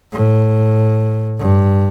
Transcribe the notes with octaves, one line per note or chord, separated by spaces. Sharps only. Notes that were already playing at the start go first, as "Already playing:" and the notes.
A2
G2